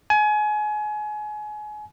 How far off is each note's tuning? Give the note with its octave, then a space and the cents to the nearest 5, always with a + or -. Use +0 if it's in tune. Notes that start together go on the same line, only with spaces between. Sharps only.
G#5 +30